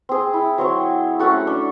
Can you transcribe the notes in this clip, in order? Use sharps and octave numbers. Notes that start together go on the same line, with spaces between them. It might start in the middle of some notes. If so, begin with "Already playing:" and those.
C4 G#4
E4
F#3 C4 C#5
G#5
A3 C#4 F#4 A4
D4